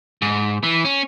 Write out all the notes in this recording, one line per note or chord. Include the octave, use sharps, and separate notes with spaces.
G#2
E3
C#4